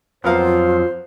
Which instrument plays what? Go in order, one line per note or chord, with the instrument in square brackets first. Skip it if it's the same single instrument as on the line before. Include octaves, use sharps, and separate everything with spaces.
[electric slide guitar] F2 F3 F#3 [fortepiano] B3 A#4 F5 [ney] F4 [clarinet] C5